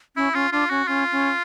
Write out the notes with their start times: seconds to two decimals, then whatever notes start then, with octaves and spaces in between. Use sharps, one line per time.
0.16 C#4 E4
0.34 C#4 F4
0.52 D4 F4
0.70 C#4 F#4
0.87 C#4 F4
1.12 C#4